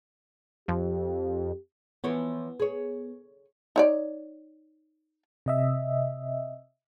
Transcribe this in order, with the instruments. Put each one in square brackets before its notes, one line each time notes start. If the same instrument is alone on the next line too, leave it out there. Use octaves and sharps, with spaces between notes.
[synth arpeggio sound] F2 [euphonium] G4
[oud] E3 F3 C#5 [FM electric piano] B3
[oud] G#4 C#5
[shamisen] D#4 C#5 D5
[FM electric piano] C3 D#5 E5